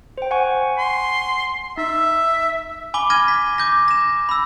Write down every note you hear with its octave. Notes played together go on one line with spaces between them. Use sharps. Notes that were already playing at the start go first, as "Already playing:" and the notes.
C5 G5
F#5 G#5 C#6
C6
D#4 E5
G#5 B5 D6 G7
F6 G#6 A#6 D#7
B6
D6 G6 A#6
A#6 E7
B5 E6